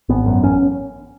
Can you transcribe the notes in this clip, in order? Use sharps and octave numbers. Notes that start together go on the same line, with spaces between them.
G#1 B3
F#2
A1 C#4